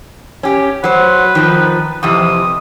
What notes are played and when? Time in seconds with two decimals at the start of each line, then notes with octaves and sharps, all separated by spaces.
0.43 C#4 G4
0.84 F#3 B4 C5
1.35 D#3 F3
2.03 F2 C3 E3 D#6